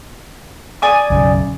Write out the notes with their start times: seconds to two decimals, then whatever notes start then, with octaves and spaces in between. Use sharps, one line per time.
0.82 D5 G#5 D#6
1.10 B1 F#2 C#3